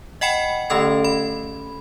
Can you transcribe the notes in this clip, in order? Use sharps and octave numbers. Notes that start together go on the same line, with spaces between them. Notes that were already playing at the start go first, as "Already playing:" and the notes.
D#5 F#5 G5 B5 C#7
D3 A3 C#4 A4 G#6
B5